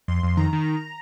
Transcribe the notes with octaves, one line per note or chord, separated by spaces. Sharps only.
F2 C6
F2
D#3 A#5
D#3